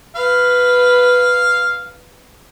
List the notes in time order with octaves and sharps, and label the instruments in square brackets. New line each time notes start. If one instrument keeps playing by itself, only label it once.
[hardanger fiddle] B4 [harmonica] F5